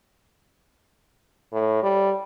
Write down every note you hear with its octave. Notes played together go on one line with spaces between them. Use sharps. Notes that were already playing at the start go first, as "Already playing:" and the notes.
A2
G3